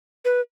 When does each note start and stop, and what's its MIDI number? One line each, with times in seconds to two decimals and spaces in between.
0.25 0.41 71